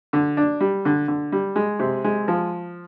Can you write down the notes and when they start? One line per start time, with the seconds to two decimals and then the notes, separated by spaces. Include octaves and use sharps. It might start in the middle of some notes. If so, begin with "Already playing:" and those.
0.13 D3
0.37 D4
0.60 G3
0.85 D3
1.08 D3
1.32 G3
1.56 G#3
1.79 C3
2.04 G#3
2.28 F3